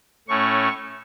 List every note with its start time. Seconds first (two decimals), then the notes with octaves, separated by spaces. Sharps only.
0.28 A2 A3 C#4 C#6